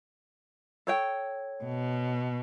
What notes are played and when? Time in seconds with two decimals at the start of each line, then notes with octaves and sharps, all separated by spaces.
0.87 A4 C#5 G5
1.64 B2